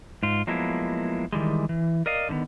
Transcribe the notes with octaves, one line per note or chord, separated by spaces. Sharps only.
G#2 F4
F3 F#3 G#3 A#3 B3 E4
D#3 E3 G3 G#3
E3
A#4 D5 D#5 F5
D3 D#3 A#3 B3